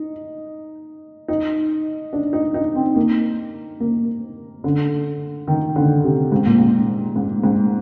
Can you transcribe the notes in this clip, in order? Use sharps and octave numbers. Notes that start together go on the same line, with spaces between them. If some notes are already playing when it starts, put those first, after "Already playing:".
Already playing: D#4
D#4
D4
D#4
D#4
C4
A#3
A#3
D3
D#3
D3
C3
G#2
A#2
G#2
G#2
G#2